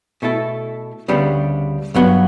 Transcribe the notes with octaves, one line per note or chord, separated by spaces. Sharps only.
B2 A3 E4 A4
D2 C#3 G3 B3 D4
G2 F#3 B3